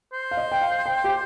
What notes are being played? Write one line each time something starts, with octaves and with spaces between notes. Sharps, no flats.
C5
F5
D#5
G5
F5
G5
G4